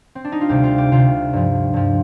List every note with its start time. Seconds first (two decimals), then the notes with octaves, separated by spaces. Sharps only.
0.15 C4
0.25 D4
0.32 D#4
0.41 F4
0.49 D2 C3 G3 G4
0.63 F4
0.78 G4
0.92 D2 C3 G3 F4
1.33 G2 F3
1.74 G2 F3